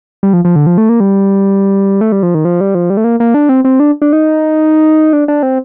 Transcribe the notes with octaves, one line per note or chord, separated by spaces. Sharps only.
G3
F3
F3
D3
F3
A3
A#3
G3
A3
G3
F3
D#3
F3
G3
F3
G3
A3
A#3
A#3
D4
C4
C4
D4
D4
D#4
D4
D4
C4